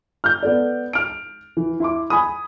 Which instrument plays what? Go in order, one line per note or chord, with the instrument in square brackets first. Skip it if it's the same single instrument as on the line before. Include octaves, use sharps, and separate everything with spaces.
[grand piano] F6 G6
B3 A4 D5
F6 D7
E3
E4 C6 D6
G#5 B5 D#6